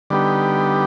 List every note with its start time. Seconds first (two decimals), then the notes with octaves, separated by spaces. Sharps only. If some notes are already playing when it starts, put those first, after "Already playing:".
0.10 D3 G3 B3 D#4 G4